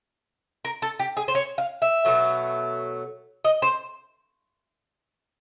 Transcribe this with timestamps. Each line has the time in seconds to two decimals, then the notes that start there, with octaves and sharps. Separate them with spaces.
0.65 A#4
0.82 A4
1.00 G4
1.17 G#4
1.28 C5
1.35 C#5
1.58 F5
1.82 E5
2.05 B2 F#3 A3
3.45 D#5
3.62 C5